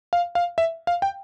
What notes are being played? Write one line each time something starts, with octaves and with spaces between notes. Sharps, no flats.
F5
F5
E5
F5
G5